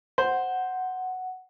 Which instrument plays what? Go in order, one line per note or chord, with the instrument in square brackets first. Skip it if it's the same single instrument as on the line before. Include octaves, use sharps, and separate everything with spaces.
[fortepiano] C5 [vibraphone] F#5